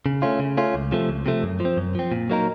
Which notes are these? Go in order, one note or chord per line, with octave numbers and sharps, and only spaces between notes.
C#3
A3 C#4 F4
C#3
A3 C#4 F4
C#2
C3 F3 A3
C#2
C3 F3 A3
F#2
F3
C4
F#2
F3 C4
A#2
F#3 A#3 D#4 A#4